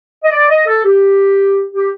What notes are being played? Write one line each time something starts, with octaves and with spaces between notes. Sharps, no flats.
D#5
D5
D#5
A4
G4
G4